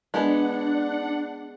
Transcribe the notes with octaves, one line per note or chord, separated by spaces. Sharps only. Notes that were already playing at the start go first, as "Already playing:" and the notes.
G#3 B3 D4 F#5